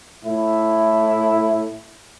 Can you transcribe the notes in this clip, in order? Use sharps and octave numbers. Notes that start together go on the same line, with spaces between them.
A2 E4